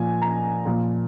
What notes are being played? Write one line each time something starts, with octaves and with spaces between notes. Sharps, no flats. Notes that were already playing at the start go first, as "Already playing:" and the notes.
Already playing: A#2 F3 G#5
A#5
A#2 F3